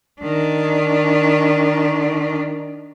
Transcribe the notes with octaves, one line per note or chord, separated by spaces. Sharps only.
D#3 D4